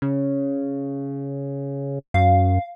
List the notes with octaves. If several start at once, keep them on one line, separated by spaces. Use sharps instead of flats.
C#3
F#2 F5